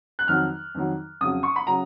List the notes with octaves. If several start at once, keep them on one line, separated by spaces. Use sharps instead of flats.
F#6
F2 D#3 F#3 F6
F2 D#3 F#3
F2 C#3 F#3 D#6
C#6
B5
C#3 F#3 A#5